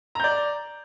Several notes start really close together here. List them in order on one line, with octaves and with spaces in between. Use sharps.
A#5 G6 D5